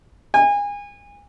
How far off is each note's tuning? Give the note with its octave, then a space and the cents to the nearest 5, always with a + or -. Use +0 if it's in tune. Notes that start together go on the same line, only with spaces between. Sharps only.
G#5 -30